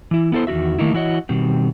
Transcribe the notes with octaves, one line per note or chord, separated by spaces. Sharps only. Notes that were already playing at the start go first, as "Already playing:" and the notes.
E3 E4
B3 E4 A4 A#4 C5
E2 D#3 E4 F#4 E5
D#3 A3 A#3 D#4 E4
E3 E4 F#4 C#5 D#5
B2 D#3 G3 C4